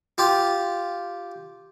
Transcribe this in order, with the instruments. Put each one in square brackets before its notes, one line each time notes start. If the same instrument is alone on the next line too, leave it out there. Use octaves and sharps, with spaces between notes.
[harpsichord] F4 G4